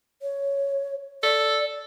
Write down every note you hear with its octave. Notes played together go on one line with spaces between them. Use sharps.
C#5
A4 D5